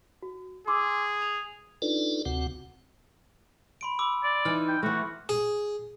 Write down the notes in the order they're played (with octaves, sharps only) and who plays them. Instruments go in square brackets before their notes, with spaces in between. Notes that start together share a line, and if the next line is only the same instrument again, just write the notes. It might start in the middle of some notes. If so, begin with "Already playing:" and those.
[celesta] F#4
[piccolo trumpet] G#4 [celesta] C6 D6 E6
[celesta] F7
[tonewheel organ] D4 D#4 F4 A4 B4 D5
D2 C3 C4 F#4 F#5
[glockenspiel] B5 C6 D7
B5 D6 E6
[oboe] D5
[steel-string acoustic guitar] E3 D#4 [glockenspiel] F6
[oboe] G5
[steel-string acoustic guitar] E3 A3 [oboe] F#4
[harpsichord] G#4